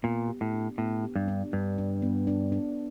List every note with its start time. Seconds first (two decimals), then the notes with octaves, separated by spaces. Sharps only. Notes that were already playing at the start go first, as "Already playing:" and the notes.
0.03 A#2 B3
0.28 G4
0.41 A2
0.54 D4
0.78 A2 B3
1.04 G4
1.16 G2
1.28 D4
1.52 G2 D4
1.78 D4
2.02 B3
2.27 D4
2.52 D4